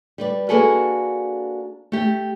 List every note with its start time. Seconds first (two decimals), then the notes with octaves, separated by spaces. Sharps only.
0.18 G3 B4 D5
0.49 A#3 D4 F#4 G#4 A4 B4
1.92 A3 G4